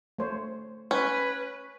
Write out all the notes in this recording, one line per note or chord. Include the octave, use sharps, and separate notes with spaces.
A3 C5 C#5
C#4 B4